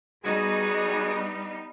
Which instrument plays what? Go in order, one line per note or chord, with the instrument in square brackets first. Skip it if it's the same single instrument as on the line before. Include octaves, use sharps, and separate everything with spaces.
[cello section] G3 B3 D#4 [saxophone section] F#4 G#4